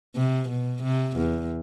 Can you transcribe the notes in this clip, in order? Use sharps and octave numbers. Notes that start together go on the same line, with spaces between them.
C3
B2
C3
E2